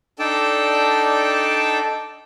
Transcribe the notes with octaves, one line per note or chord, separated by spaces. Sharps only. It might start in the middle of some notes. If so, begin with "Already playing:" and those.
D4 D#4 A4 D5 G5 A5